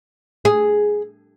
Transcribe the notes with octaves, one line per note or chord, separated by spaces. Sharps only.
G#4